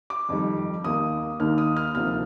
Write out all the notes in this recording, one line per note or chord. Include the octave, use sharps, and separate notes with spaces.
D6
F2 D#3 G3
D#2 D#3 A#3 D#6
D#2 D#3 A#3 F6
D#6
F6
D2 C3 F3 A#3 D4 F6